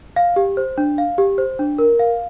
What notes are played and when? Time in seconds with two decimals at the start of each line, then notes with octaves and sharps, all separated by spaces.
0.16 F5
0.36 G4
0.57 C5
0.78 D4
0.98 F5
1.18 G4
1.38 C5
1.59 D4
1.79 A#4
1.99 F5